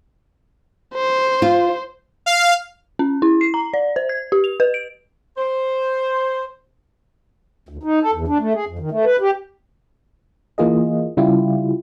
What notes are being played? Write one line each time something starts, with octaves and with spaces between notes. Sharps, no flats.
C5
F4
F5
C#4
E4
C7
A#5
D5
C5
G#6
G4
F7
B4
D7
C5
D2
D#4
A4
E2
D4
A3
G#4
F2
D#3
A3
B4
G4
E3 A#3 F4 G#4 D#5
C#3 G3 E4 F4 G4